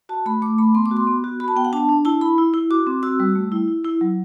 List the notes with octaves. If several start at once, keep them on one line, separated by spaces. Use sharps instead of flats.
F#4 A5
A3 B5
A3 D6
A3 B5
B3 C6
D6
F#4
C6
B3
F#4
F#4 B5
A5
B3 G5
F#5
D4 A5
D4
E4 A5
E4 B5
E4
E4
F#4 D6
C4
F#4 E6
G3
A3
E4
E4
E4
F#3